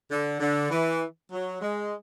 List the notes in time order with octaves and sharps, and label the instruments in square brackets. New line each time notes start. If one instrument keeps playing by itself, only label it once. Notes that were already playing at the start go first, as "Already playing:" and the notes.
[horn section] D3
D3
E3
F#3
G#3